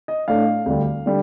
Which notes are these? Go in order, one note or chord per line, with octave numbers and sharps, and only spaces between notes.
D#5
A2 A3 D4 F5
D2 D3 G3
D3 G3